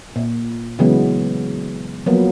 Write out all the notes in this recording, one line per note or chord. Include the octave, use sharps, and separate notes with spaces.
A#2
C#3 E3 F#3 G#3 B3
F3 F#3 A#3 B3